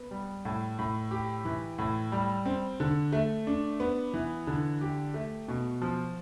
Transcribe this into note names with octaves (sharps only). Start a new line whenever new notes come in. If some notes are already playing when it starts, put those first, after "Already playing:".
Already playing: B3
G3
A2
A2
G4
E3
A2
G3
C4
D3
A3
D4
B3
E3
D3
G4
A3
B2
F3